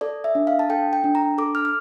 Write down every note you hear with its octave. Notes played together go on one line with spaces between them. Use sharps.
A4 D5
E5
D4
F5
A5
A4 G5
G5
D4
A#5
A4 D6
F6
F6